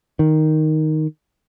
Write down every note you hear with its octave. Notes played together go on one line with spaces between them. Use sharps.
D#3